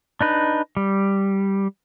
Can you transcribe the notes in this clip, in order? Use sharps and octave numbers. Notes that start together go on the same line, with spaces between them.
D4 D#4 B4
G3